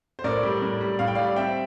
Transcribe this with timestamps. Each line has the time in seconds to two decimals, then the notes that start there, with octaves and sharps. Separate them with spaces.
0.19 C5
0.24 A2 A#4 D5
0.43 G3
0.62 A2
0.81 G3
0.99 A2 F5
1.07 G5
1.15 G3 D5 F5
1.36 C4 E5 G5